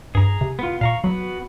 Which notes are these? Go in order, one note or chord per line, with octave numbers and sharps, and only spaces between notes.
G2 G#4 A#5
C3
B3 F4
A#2 F5 A#5 C#6
F#3 B3 F#4